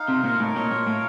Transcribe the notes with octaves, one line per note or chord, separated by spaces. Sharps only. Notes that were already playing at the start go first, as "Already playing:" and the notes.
Already playing: D#4 F5
C3
A#2 A#4
A2
A#2 C#5
A#2
A2 F5